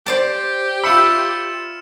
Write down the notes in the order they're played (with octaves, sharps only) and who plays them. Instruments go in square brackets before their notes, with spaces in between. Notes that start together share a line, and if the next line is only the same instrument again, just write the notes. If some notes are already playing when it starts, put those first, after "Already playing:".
[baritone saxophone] G4 [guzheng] C5 D5 A5
[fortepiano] F4 E5 B5 [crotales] E6 C#7 E7